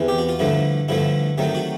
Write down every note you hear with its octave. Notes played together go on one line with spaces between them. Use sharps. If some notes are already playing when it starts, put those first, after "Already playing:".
Already playing: E2 C3 E3
G4
F#4
F4
G2 D3 F3 A3 E4
G2 D3 F3 A3 E4
C3 D#3 F#3 A3
F#4